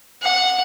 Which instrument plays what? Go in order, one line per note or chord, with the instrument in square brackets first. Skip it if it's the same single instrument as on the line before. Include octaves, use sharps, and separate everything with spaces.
[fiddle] F#5